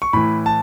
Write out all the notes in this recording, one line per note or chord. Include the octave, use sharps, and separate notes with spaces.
C#6
A2 E3 B5
A5